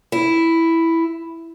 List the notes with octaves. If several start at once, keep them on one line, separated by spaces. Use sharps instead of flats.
E4